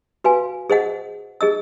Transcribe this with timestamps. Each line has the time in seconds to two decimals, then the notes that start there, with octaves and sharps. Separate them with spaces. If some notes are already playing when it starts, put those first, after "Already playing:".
0.24 F#4 B4 F5 G#5
0.70 G#4 C5 D#5 F#5
1.41 G#4 D#5 E6